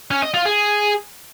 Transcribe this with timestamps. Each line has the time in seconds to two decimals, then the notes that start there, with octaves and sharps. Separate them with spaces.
0.11 C#4
0.22 D#5
0.34 F4
0.45 G#4